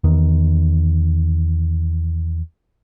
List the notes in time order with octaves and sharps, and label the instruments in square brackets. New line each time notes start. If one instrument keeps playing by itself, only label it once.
[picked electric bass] E2 D#3